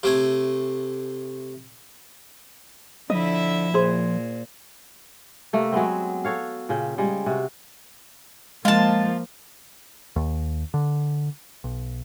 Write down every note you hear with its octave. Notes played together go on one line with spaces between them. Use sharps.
C3 A3 G#5
D3 F3 E4 D#5 E5
A#2 G#4 C5
C3 A3 A#3
F#3 G#3 B3 C4
F#4 A4 C#5 F5
A#2 C#3 G5
C#3 G3 G#3
C3 F#4
F3 G#3 A#3 F4 A5
D#2
D3
B1